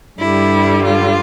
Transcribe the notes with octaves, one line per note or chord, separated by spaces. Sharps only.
G2 D3 G3 E4
F4